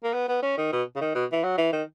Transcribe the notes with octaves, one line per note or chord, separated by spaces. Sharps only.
A#3
B3
B3
C#4
D#3
B2
C#3
D#3
B2
E3
F#3
E3
D#3